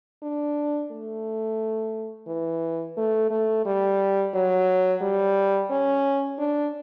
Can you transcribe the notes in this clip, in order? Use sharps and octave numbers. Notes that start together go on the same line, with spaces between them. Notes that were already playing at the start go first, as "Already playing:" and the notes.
D4
A3
E3
A3
A3
G3
F#3
G3
C#4
D4